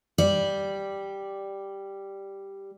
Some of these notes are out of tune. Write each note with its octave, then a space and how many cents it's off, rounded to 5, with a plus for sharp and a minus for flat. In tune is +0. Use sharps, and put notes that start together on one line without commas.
G3 +0 D5 +0